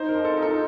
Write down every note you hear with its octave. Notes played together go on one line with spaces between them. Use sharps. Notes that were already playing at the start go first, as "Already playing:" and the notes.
Already playing: D#4 C5
A#4
F3
A4
D#4
A4